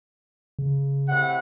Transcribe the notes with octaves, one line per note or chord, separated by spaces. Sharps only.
C#3
A2 C3 F#5